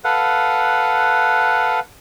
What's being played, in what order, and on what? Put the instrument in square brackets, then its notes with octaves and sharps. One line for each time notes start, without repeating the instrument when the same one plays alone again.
[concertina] A4 B4 F5 F#5